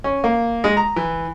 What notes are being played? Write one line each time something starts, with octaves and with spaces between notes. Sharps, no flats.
C#4
A#3
G#3
A#5
E3